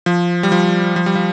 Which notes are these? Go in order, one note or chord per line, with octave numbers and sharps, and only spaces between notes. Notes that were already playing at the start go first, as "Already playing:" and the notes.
F3
G3
F3
F3
G3
F3